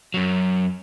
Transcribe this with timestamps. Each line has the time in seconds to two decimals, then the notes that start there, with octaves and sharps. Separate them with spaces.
0.14 F#2 F#3